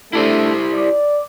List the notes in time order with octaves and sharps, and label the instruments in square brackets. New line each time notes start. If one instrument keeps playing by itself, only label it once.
[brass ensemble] A3 D4 A4 [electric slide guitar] E4 G4 C5
[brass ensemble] D5